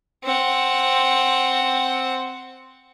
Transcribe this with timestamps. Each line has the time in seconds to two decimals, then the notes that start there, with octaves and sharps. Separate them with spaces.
0.24 C4 F#5